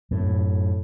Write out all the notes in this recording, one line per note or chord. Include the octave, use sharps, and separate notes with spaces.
F#2 A2